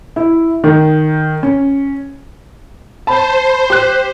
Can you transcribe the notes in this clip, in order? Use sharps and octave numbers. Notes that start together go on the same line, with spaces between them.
E4
D#3
C#4
C5 A5 B5
G4 F#6